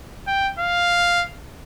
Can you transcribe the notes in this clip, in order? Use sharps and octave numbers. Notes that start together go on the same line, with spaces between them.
G5
F5